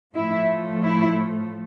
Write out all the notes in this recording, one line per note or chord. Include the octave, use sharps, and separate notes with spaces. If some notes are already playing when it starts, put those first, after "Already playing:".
A2 F3 A3 E4
E4